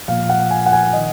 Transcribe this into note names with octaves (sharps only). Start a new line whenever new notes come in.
A#2 F3 F5
F#5
G#5
F#5
G#5
D#3 D#5